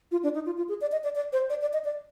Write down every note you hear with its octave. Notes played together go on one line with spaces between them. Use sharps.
F4
D4
D#4
F4
F4
G#4
D5
D#5
D5
D5
C5
D5
D5
D#5
D5